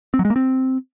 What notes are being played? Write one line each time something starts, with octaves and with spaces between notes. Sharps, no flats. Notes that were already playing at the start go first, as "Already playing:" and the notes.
C4
F#3
G#3
A#3
C4